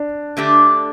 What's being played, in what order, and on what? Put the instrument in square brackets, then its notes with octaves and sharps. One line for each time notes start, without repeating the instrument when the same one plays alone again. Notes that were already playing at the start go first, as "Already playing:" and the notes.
Already playing: [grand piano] D4
[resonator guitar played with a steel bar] D3 A3 D4 G4